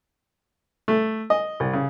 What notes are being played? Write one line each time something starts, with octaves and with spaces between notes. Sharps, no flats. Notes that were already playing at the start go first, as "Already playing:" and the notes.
A3
D#5
C2
C#3